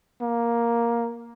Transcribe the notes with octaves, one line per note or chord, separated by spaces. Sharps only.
A#3